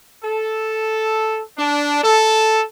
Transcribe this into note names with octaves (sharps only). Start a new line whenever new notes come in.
A4
D4
A4